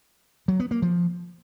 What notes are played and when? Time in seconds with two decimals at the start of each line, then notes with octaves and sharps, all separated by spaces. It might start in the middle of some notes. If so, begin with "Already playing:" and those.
0.48 F#3
0.60 B3
0.71 A#3
0.82 F3